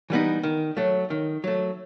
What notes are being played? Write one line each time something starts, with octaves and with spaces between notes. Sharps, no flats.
E3 G3 B3 D#4
D#3
F#3 A3
D#3
F#3 A3